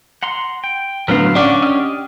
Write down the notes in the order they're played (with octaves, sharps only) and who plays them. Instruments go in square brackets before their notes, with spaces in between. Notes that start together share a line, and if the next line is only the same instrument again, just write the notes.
[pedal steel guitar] F#5 A#5 C6
G5
[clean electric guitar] A2 F#3 [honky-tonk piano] D3 B3 F6 [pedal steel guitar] B4 F5
[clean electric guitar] C#4 D4 [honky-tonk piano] D5 F#5 D6
[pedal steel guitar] G4 D#5 [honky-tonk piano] F6